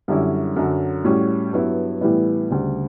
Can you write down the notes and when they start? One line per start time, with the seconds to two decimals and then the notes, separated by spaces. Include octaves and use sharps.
0.08 F#2 D3 G3 C#4 E4
0.56 F#2 D3 F#3
1.04 A2 G3 C#4 F#4
1.53 G2 F#3 B3 E4
2.01 A2 E3 G3 B3 E4
2.50 D2 C#3 G3